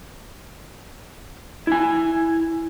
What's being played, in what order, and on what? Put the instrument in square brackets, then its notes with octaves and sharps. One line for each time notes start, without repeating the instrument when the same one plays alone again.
[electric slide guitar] E4 G#5